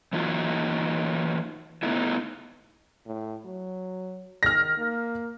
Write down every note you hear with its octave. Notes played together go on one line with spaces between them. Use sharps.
E3 A#3 D#4 F4 F#4
A3 B3 D#4 E4
A2
F#3
D#3 F6 A#6
A#3